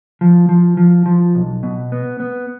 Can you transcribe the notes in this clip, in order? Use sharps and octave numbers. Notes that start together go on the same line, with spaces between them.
F3
F3
F3
F3
B1
B2
B3
B3